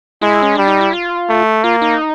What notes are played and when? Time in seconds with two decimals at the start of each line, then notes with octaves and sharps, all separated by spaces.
0.22 G#3 E4
0.42 C#4
0.55 G3 D4
0.68 D#4
0.81 E4
0.93 F4
1.29 A3
1.64 A#3 F4
1.82 D#4